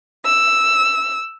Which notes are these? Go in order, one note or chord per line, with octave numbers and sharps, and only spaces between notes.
E6